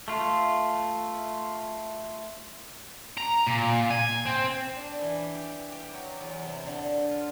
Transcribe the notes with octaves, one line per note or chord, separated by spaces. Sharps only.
A3 F4
A#5
A#2
G#5
C4
D4
E3
G4
G4
F#3
E2
C3
D3
F4